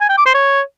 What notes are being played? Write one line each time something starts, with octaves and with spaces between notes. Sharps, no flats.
G#5
G5
D6
C5
C#5